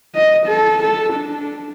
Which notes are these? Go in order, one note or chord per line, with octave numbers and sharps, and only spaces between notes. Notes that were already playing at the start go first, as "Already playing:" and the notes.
D#5
A4
A4
D4